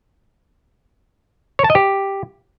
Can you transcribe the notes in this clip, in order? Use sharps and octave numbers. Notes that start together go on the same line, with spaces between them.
C#5
A5
D#5
G4